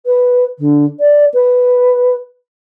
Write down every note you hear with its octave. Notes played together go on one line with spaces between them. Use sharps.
B4
D3
D5
B4